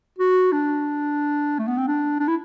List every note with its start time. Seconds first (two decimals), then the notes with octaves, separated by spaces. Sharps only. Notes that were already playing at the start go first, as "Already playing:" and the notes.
0.19 F#4
0.52 D4
1.59 A3
1.68 B3
1.78 C4
1.87 D4
2.20 D4
2.28 E4